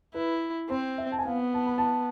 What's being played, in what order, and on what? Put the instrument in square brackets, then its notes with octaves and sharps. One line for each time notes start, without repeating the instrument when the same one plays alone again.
[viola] E4 [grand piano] B4
[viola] C4 [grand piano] C5
[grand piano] E5
A5
G#5
[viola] B3 [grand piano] F5
[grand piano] A5
B5
A5